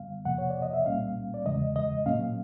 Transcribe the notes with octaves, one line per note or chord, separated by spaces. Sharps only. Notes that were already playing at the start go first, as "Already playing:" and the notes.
Already playing: F#2 D3 G3 B3 F5
F2 C3 F3 A#3 F#5
C#5
D5
D#5
E5
C2 A#2 G3 A#3 C#4 F5
D5
E2 C#3 E3 G#3 D#5
D#5
A#2 F#3 A#3 C#4 F5